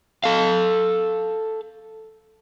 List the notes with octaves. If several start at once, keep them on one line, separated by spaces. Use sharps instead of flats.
A4 F5